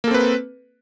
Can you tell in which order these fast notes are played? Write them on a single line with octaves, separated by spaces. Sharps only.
A#3 A4 C4 B4